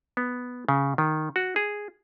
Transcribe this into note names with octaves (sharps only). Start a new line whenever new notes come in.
B3
C#3
D#3
F#4
G#4